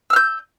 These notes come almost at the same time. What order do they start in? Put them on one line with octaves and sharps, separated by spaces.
E6 F6 G6